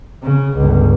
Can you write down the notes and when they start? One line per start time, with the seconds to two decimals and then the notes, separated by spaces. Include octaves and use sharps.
0.23 C#3
0.56 G1 C#2